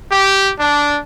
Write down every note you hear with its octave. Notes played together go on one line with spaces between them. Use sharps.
G4
D4